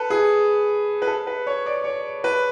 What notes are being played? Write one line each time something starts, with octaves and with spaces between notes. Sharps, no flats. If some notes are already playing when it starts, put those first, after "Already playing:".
Already playing: A4 B4
G#4
B4
A4
B4
C#5
D5
C#5
B4